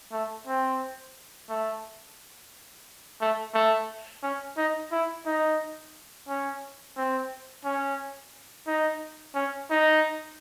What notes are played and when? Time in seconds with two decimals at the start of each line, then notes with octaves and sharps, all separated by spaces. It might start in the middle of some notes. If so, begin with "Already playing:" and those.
0.12 A3
0.47 C4
1.49 A3
3.21 A3
3.54 A3
4.22 C#4
4.57 D#4
4.92 E4
5.26 D#4
6.28 C#4
6.96 C4
7.64 C#4
8.67 D#4
9.35 C#4
9.70 D#4